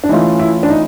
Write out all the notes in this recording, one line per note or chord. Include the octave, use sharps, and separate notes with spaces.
D4
E3 A3 C#4 D#4 F4
E4
D4
D#4